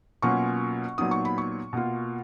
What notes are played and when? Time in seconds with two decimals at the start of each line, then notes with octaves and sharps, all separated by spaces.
0.22 B2 F#3 A#3 C#4 F4 C#6
0.98 A#2 F#3 B3 D#4 D#6
1.11 C#6
1.25 B5
1.38 C#6
1.73 B2 A#3 F4